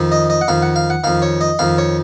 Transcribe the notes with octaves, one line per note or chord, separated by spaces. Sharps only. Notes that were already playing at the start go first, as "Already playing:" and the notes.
Already playing: F2 D#3
D#5
D#5
F#5
F2 D#3 F5
F#5
F5
F#5
F2 D#3 F5
C#5
D#5
F2 D#3 F5
C#5